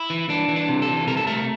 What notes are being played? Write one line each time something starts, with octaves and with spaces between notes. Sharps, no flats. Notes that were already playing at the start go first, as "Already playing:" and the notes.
Already playing: E4
E3
E3 D4
E3
D4
C3
A4
E3
C3 A#4
A4
A3 A#4